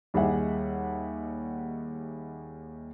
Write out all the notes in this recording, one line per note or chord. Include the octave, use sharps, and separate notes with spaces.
D#2 G3 G#4 D#5 E5 F#5